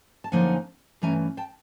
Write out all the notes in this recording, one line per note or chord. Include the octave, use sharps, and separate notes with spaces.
A5
F#2 D3 F3 A#3 D#4 F#5 G#5
G2 E3 A3 C#4 G#5 A#5
G5 A5